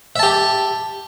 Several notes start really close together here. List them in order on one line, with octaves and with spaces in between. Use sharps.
E5 A5 G4